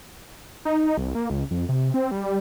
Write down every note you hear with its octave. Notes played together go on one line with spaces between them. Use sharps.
D#4
C2
A#3
C#2
F2
C3
C4
G3